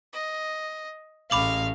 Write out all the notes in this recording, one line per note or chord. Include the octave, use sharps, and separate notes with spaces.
D#5
A1 G#3 A3 F5 B5 D6 F#7